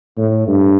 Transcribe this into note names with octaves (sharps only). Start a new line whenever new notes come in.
A2
G2